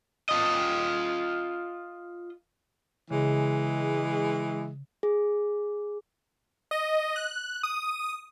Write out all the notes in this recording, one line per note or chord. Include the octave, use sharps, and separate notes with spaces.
F4 D#5
C#3 E3 G#3
G#4
D#5
F#6
D#6